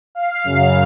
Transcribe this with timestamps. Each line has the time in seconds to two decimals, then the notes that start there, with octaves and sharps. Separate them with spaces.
0.15 F5
0.44 F#2 C#3 F#3